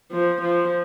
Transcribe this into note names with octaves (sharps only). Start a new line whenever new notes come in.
F3
F3